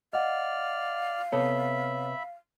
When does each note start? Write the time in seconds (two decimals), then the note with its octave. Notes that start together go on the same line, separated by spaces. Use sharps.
0.13 D5 D#5 F5 F#5 F6
1.32 C3 B3 A4 C#5 E5 B5